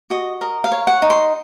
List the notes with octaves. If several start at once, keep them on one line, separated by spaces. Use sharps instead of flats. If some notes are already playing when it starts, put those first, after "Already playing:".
F#4 D#5
A#4 D#5
F5
C#5
F#5
D#4
C6